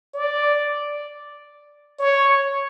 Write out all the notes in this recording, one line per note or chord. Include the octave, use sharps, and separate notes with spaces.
D5
C#5